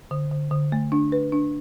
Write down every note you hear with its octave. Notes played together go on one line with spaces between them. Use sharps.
D3
D3
D3
A3
D4
B4
D4